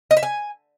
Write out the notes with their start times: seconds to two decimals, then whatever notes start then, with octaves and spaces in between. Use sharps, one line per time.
0.11 D#5
0.17 E5
0.23 G#5